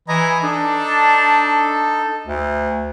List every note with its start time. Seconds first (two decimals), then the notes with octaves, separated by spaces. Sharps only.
0.08 E3 D#5 G#5 A#5
0.43 D4 D#4 A4
2.27 D2